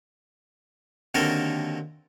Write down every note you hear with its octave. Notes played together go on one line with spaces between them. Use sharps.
D#2 D3 F#3 C4 A4 A#4